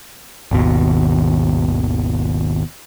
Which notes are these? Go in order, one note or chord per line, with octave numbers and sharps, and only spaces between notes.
G#1 D#2 B2